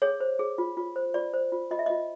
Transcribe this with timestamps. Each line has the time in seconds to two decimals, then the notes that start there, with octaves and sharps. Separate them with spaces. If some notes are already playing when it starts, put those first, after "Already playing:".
0.02 G#4 C#5
0.20 C5
0.39 G#4
0.58 F4
0.77 F4
0.96 C5
1.14 F4 D5
1.34 C5
1.52 F4
1.71 F4 D#5
1.79 E5
1.86 F4 D#5